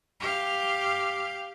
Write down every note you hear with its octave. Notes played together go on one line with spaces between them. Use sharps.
G4 F5